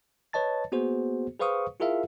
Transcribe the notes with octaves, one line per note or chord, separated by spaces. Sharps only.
B4 C#5 D#5 A5 A6
A#3 B3 F#4 G#4 C5
G#4 B4 C5 F5 C#6 D#6
E4 F4 G#4 A#4 E5 F5